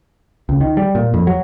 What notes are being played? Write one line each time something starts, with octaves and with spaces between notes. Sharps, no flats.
C#2
D#3
G3
A#2
F2
F#3